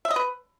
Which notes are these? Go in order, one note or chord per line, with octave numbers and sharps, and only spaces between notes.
E5
D#5
B4